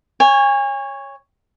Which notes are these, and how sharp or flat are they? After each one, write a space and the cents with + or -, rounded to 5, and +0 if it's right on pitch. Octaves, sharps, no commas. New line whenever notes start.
C#5 +0 G#5 -35